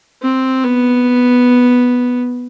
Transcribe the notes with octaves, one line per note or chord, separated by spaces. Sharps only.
C4
B3